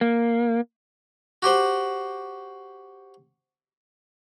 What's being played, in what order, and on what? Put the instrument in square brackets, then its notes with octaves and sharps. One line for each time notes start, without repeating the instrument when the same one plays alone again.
[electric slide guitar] A#3
[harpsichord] F#4 G4 C5 F#5